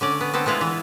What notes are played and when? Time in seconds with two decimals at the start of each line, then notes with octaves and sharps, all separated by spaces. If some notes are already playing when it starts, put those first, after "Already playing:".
0.01 D3 C#4 D5
0.21 B3
0.34 B3 C4 A4
0.46 G#3 B3 E4 F4
0.61 E3